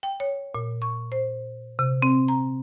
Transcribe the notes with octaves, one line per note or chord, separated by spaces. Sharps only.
G5
C#5
A#2
C#6
C5
C3
C4
A#5